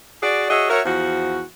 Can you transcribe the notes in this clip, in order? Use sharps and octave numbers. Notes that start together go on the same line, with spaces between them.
F#4 G#4 D5
F#4 G#4 C#5 D#5 E5
F#4 A#4 C#5 E5
E2 F3 F#4